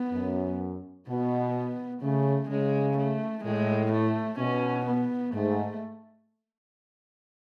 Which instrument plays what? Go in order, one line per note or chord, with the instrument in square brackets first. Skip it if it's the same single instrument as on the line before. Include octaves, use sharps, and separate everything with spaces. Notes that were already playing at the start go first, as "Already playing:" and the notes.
Already playing: [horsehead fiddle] B3
[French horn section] F#2
[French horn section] B2 [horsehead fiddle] B3
[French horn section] C#3 [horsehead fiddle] A3
[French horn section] C#3 [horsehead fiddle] G#3
[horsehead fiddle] A3
[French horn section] A2 [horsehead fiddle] G#3
[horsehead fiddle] A3
[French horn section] B2 [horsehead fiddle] C#4
[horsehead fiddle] B3
[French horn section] G#2 [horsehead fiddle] A3